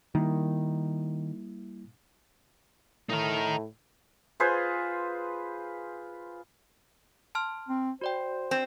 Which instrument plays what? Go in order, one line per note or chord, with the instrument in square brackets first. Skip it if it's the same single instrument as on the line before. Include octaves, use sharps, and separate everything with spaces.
[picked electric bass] D#3 [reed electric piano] G3 A#3 E4
[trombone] A2 [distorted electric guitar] D#4 A#4
[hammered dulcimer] F4 G#4 B4 C5
[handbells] A5 C6 F6
[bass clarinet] C4
[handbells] F#4 D5 G5 [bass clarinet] C5
[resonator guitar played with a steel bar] C4